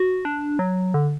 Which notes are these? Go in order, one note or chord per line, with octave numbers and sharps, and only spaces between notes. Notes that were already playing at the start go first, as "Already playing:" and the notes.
Already playing: F#4
D4
F#3
D3